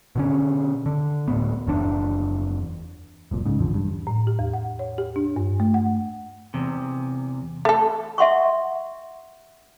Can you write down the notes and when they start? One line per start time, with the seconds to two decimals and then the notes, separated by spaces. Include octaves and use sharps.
0.16 B2 D3 C#4
0.86 D3
1.28 D1 A2 B3
1.66 F#1 E2 B2 D4
3.31 F1 C2 A#2
3.46 G#2 C#3
3.59 A1 E2 D3 F3
3.74 G2
4.07 A2
4.27 G4
4.39 E2
4.53 F#5
4.79 C#5
4.98 G4
5.16 D4
5.36 G2
5.60 A3
5.74 F#5
6.54 E2 C3
7.65 A3 A4
8.18 E5 F#5 C6 C#6